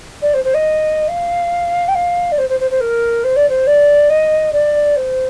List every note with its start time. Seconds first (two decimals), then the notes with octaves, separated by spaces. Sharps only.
0.21 D5
0.33 C5
0.43 C5
0.54 D#5
1.08 F5
1.87 G5
1.94 F5
2.31 D5
2.37 C5
2.48 C5
2.59 C5
2.70 C5
2.80 A#4
3.23 C5
3.36 D5
3.48 C5
3.66 D5
4.09 D#5
4.52 D5
4.95 C5